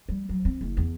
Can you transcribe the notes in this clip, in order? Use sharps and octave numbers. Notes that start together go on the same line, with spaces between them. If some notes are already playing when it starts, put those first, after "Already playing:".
G3
F#3
C4
F#1
E2